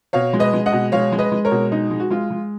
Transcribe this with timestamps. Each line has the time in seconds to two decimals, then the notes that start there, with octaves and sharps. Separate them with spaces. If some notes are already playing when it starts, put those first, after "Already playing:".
0.13 B2 C#5 F5
0.33 G#3
0.40 B4 D#5
0.53 G#3
0.66 D#5 F#5
0.73 B2
0.92 G#3 C#5 F5
1.12 G#3
1.19 B4 D#5
1.32 G#3
1.45 A#4 C#5
1.51 B2
1.72 G#3 D#4
1.90 G#3
2.00 F#4
2.10 G#3 F4
2.31 G#3